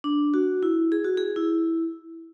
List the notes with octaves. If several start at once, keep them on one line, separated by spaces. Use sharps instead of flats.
D4
F#4
E4
G#4
F#4
G#4
E4